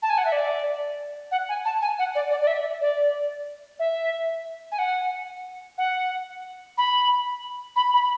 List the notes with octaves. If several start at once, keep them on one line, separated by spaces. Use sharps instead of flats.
A5
G#5
F#5
E5
D5
F#5
G#5
A5
G#5
F#5
D5
D5
D5
E5
D5
E5
G#5
F#5
F#5
B5
B5
B5